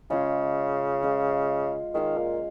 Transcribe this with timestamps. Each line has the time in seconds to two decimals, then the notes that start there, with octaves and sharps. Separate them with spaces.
0.10 C#3 G#3 C#4 F4
1.03 G#3 C#4 F4
1.94 D#3 G#3 F4 C#5 F5
2.18 A#2